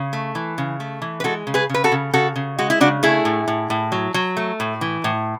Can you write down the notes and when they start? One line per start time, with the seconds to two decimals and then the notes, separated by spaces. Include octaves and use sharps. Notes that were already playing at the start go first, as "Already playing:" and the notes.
Already playing: C#3
0.13 A3
0.35 E3
0.58 C#3
0.80 A3
1.02 E3
1.20 B4
1.24 G#3 F#4 A4
1.47 C#3
1.54 G#4 B4
1.69 C#3 B4
1.84 F#4 A4
1.92 C#3
2.14 C#3 F#4 A4
2.36 C#3
2.59 G#3 F#4
2.70 E4
2.80 C#3 D4 F#4
3.03 A3 E4 G#4
3.25 A2
3.48 A2
3.70 A2
3.92 F#3
4.14 F#3
4.37 A3
4.60 A2
4.81 E3
5.04 A2